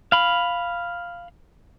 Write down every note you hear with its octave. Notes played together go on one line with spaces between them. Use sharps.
F5 B5